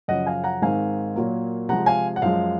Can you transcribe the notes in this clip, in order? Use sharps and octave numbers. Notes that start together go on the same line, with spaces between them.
F#2 C#3 F3 D#5 F#5
F5 G#5
F#5 A#5
G#2 D#3 G#3 C4 D#4 F5 G#5
A#2 F#3 A#3
C3 F3 G#3 F#5 A#5
F5 G#5
F#5
F#2 F3 G#3 F5